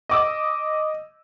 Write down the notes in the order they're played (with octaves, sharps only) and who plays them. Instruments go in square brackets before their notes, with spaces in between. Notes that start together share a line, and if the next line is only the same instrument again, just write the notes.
[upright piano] D#5 D6 E6